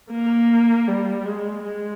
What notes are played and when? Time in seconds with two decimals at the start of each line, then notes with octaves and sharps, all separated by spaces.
0.11 A#3
0.88 G3
1.25 G#3
1.64 G#3